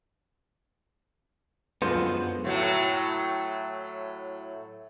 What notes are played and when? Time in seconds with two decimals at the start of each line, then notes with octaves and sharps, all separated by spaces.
1.82 F#2 D3 F3 G#3 B3 C5
2.44 A2 F#3 A3